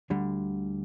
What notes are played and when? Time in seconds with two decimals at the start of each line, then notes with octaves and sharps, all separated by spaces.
0.10 D2 D3 G3